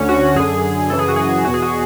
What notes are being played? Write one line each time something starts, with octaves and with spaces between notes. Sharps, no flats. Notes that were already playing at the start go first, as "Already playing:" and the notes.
Already playing: D2 D3 C#4
F#4
F#2 D3 G#4
F#2 C#3 E3 A4
G#4
F#4
G#4
E2 B2 F#4
G#4
F#4